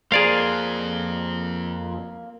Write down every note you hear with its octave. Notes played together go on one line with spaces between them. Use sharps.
F2 A#3 G#4 A#4 C5 D5 F5